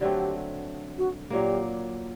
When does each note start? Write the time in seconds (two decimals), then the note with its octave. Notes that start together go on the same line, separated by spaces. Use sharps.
0.01 D3 F#3 A3 C4 G4
0.98 F#4
1.30 A#2 F#3 A#3 G4